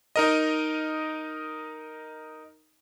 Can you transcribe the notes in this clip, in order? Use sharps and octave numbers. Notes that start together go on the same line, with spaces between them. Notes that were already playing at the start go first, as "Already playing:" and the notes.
D#4 A#4 D#5